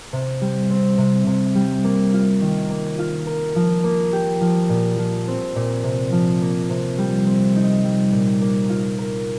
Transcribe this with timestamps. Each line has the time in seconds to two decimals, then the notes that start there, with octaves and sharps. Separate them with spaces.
0.13 C3
0.41 G3
0.70 C4
0.98 C3
1.27 C3
1.55 G3
1.84 A#3
2.13 F4
2.41 D#3
2.70 A#3
2.99 F4
3.27 A#4
3.56 F3
3.84 A#3
4.13 G4
4.41 F3
4.69 A#2
4.98 F3
5.28 C4
5.56 A#2
5.84 C3
6.12 F3
6.41 A#3
6.70 C3
6.98 G3
7.27 C4
7.56 D#4
7.84 G3
8.12 A#2
8.41 A#3
8.69 F4
8.98 A#4